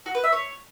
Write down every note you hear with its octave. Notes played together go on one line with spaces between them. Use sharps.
F#4
B4
E5
C#5